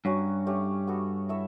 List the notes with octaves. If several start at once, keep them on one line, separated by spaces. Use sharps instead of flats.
G2 F#3 C#4 F#4
A3 C#4 G4 C#5
B3 F#4 A4
E4 A4 C#5 E5